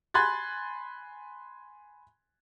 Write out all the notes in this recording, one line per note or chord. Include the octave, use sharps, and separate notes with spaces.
G#5 B5 C6 F#6 G#6 A6